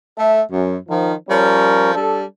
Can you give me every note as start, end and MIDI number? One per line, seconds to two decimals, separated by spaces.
0.18 0.42 57
0.18 0.42 69
0.18 0.42 76
0.51 0.76 42
0.89 1.14 51
0.89 1.14 53
1.29 1.92 53
1.29 1.92 55
1.29 1.92 61
1.29 1.92 70
1.29 1.92 73
1.94 2.23 55
1.94 2.23 62
1.94 2.23 69